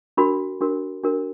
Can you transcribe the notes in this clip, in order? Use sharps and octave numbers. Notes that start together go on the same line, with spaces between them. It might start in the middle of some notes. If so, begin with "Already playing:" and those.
D4 F#4 A#4 B5
D4 F#4 A#4
D4 F#4 A#4